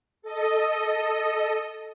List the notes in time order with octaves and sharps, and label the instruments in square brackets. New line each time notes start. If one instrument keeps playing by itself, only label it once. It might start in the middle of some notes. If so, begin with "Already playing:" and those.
[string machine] A4 D#5